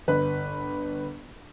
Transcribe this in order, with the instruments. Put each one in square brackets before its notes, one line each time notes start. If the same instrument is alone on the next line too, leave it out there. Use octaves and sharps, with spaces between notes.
[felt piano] G1 B4